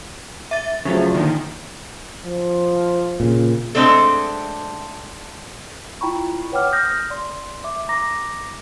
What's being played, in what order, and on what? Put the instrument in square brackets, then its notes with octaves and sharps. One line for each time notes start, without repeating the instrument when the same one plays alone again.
[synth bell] E5 A6
[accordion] E2 F3 [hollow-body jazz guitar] C#3 F#3 A3
[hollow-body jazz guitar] A#2 D3 [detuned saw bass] D#3
[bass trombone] F3
[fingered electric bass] A#2 C#3
[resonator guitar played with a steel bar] G#3 A3 C4 D4 A4
[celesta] E4 F4 G5 A#5 B5 C#6
B4 C#5 F#5 G5 D6 F6
D#6 F6 G6 A#6
D5 C6
E5 D6
A#5 D6 A#6